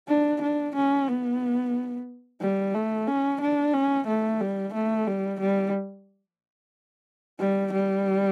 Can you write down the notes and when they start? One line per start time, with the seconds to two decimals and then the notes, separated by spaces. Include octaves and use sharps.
0.09 D4
0.42 D4
0.75 C#4
1.08 B3
2.41 G3
2.74 A3
3.08 C#4
3.41 D4
3.74 C#4
4.07 A3
4.40 G3
4.74 A3
5.07 G3
5.40 G3
7.39 G3
7.73 G3